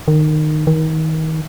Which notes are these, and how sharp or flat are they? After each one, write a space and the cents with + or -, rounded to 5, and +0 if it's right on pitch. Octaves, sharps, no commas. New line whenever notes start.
D#3 -20
D#3 +30